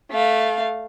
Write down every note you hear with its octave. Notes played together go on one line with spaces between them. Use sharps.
A3 F5